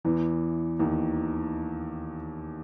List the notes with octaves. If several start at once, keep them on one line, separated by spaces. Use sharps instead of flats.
E2 E3
D#2 D#3